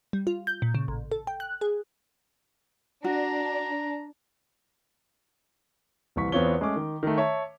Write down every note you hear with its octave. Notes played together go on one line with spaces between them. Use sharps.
G3
F4
G6
A#2
C#3
A1
A4
G5
F#6
G#4
D4 F#4 A#5
D#1 C2 E3 C#6 B6
E2 B3 C4 F4 C#5 G7
G#3 A3 C#4 D6
D#3
D#3 A3
C#5 E5 A5